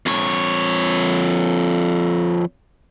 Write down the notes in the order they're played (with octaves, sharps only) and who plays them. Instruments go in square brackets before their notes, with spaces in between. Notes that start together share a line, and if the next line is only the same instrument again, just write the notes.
[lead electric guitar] F2 C#5